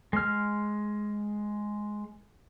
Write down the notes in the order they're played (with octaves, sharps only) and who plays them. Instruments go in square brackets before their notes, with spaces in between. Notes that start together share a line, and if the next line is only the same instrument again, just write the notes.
[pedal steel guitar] G#3 F6